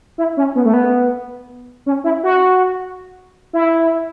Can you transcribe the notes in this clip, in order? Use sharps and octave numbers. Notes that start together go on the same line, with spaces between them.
E4
C#4
B3
A3
B3
C#4
E4
F#4
E4